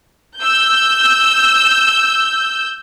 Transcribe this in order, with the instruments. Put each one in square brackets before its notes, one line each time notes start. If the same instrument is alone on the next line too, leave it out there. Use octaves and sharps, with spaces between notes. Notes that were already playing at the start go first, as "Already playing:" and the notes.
[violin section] E6 G6